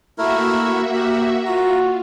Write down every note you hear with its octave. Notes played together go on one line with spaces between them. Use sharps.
A3 A#3 E4 F#4 A#4 E5
G4 A#4
F4 F#4 A#5